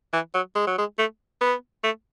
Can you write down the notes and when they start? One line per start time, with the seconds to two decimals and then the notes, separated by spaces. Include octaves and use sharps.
0.13 E3
0.34 F#3
0.55 G#3
0.67 F#3
0.78 G#3
0.98 A3
1.41 B3
1.84 A3